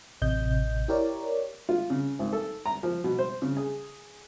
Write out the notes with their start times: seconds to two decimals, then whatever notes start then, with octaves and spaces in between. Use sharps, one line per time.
0.22 A1 C3 D#5 G6
0.88 E4 G4 A#4 C#5 D5
1.69 F4
1.90 C#3
2.19 G#1
2.33 A4
2.66 A#5
2.83 F3
3.04 B2
3.19 C5
3.42 C#3
3.57 G#4